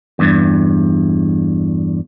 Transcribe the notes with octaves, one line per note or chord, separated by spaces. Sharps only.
E2 G2